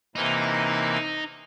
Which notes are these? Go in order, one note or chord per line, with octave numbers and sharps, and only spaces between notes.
C3 E3 A#3 D#4